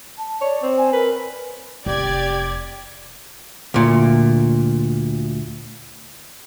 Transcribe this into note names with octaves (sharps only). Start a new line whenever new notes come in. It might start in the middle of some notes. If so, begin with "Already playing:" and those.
A5
C#5 D5
C4
G#5
A#4 B4
F1 G4 D5 G#6
D2 A#2